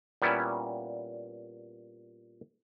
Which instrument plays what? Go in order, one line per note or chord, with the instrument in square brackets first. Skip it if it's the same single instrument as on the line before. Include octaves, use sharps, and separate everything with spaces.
[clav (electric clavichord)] A#2 G3 B3 C#4 E4